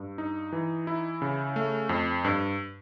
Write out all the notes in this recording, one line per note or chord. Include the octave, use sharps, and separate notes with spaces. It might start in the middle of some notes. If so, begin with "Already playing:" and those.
Already playing: G2
D#4
E3
E4
C#3
A3
F2
G2